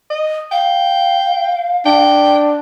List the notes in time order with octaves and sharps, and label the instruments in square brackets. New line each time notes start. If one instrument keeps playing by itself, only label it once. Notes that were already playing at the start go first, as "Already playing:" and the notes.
[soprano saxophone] D#5
[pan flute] F5 [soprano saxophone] G5
[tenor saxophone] D4 [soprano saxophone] G5